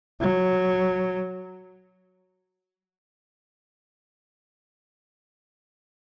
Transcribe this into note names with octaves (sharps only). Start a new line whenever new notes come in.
F#3